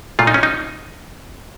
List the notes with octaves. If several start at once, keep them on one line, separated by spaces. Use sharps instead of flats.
A#2 A3 F4
D#4
C#4
D#4